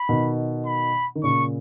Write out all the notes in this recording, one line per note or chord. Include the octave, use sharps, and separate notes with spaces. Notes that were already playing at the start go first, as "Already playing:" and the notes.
Already playing: B5
B2 D#3
B5
D#3
A#2 C#3 C#6